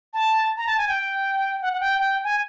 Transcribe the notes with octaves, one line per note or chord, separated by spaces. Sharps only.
A5
A#5
A5
G#5
G5
F#5
F#5
G5
G5
G#5